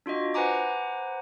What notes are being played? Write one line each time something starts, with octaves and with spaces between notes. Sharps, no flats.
D4 F4 F#4 D#5
B4 C5 F#5 G#5 A#5 D6